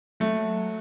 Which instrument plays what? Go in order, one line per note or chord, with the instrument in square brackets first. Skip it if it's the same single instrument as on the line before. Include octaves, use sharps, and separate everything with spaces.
[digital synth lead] F#3 [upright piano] A3